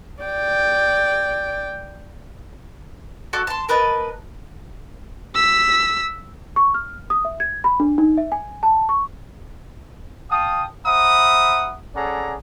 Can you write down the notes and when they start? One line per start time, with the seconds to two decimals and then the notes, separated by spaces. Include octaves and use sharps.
0.23 D5 G5
3.33 F#4 A4 D5
3.47 A5 C6
3.69 A#4 B4 D#5 A5
5.35 E6 B6
6.56 C#6
6.74 F6
7.10 D#6
7.25 E5
7.40 G#6
7.64 B5
7.80 D4
7.98 D#4
8.17 E5
8.32 G#5
8.63 A5
8.89 C#6
10.30 F5 G5 A5 D#6
10.86 C5 E5 F#5 A#5 B5 D#6
11.95 C#4 G#4 A4 D5 F#5 A#5